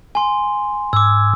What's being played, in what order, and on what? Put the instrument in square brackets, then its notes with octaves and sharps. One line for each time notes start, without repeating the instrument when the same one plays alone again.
[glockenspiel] G#5 C6
[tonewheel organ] G#2 [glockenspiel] D6 E6